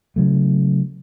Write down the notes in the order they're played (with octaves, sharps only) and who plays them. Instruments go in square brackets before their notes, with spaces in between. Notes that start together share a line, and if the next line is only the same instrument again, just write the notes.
[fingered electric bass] C#3 F#3 A3